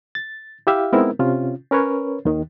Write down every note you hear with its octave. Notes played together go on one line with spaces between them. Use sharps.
A6
E4 G4 E5 F5
G#3 B3 C4 D#4 E4 A#4
C3 C#4 F4
C#4 A#4 B4 C#5
D#2 D#3